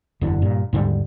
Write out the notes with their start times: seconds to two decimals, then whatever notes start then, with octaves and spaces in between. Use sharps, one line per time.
0.21 F#1 E2 D3
0.42 G2 A#2
0.73 D#2 G#2 D3 G3